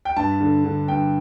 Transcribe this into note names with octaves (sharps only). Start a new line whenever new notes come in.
G5
G2 A5
D3
D3
G2 G5